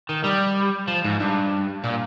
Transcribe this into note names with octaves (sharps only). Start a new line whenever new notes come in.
D#3
G3
F3
G#2
G2
A#2